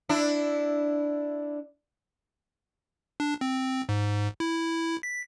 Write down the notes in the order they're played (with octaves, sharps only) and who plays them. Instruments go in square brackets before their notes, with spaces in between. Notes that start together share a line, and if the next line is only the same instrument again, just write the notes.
[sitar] D4 E4
[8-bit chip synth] D4
C4
G#2
E4
B6